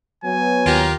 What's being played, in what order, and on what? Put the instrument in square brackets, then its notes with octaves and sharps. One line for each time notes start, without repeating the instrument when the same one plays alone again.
[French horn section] F#3 B3 [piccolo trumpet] G#5
[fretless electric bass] D#2 [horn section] F4 G4 A#4